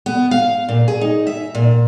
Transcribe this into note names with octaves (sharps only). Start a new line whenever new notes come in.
B3
F5
A#2
G#4
D#4
E5
A#2